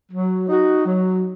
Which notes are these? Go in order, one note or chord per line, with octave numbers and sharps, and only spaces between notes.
F#3
D#4 F#4
F#3